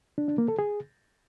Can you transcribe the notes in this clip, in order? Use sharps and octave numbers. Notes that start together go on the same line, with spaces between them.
D4
D4
A#3
A4
G#4